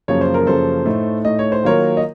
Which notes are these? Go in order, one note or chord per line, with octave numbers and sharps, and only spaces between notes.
F#2 C#3 F3 A#3 C#5
C5
A#4
F#2 C#3 F3 A#3 A4 C5
A2 A3 D#4
A2 A3 D#4 D#5
C#5
C5
D#3 F#3 A#3 F4 A#4 C#5
D#5